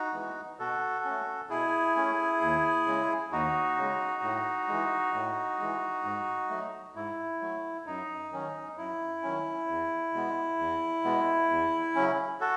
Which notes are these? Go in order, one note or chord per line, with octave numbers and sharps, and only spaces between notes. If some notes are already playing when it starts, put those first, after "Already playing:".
Already playing: D#4 F#4
E3 G#3 B3
B2 F#4 A4
A3 C#4
B2 E4 G#4
A3 C#4
D#2
C#3 G#3
D#2 D#4 F#4
C#3 G#3
A2
E3 G#3
A2
E3 G#3
G#2
F#3 A3
G#2 E4
F#3 A3
F#2 D#4
D#3 F#3 C#4
F#2 E4
D#3 F#3 C#4
E2
B2 G#3 B3
E2
B2 G#3 B3
E2
C#3 F#3 C#4
F#4 A4